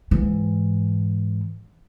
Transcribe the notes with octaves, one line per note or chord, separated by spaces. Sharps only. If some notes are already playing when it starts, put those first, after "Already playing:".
G#2 E3